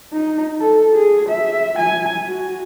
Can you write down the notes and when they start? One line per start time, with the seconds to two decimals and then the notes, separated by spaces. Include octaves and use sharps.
0.13 D#4
0.60 A4
0.95 G#4
1.29 E5
1.79 G#5
2.27 F#4